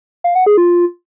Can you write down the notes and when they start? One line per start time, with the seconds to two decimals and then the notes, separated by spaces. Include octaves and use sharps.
0.24 F5
0.35 F#5
0.46 G#4
0.57 F4